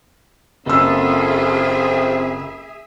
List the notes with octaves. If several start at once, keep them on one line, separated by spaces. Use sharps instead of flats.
F#1 C4 F4 F#4 G#4 A4 E5 E6